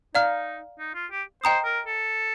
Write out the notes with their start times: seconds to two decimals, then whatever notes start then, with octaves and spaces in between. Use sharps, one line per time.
0.14 D#4 D5 F5 A#5 F6
0.79 D#4
0.95 F4
1.11 G4
1.43 C5 D#5 G5 A#5 D#6
1.65 A#4
1.87 A4